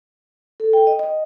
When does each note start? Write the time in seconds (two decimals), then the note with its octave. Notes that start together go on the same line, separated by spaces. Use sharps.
0.60 A4
0.73 G5
0.87 D#5
0.99 D#5